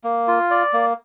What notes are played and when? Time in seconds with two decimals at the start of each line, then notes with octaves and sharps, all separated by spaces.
0.04 A#3
0.28 F4
0.51 D5
0.73 A#3